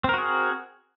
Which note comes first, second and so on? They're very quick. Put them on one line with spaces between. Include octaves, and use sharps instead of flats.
C4 A#4 F#4 G#4